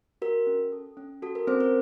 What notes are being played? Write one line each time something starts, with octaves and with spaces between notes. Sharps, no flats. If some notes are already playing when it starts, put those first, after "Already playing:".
F#4 A#4
C#4
A4
C#4
F#4 A4
A#4
C4 C#4 C5
A#4